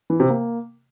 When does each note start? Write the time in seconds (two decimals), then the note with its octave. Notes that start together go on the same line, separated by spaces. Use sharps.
0.10 E3
0.20 C3
0.30 A#3